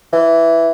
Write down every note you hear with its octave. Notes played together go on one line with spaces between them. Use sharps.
E3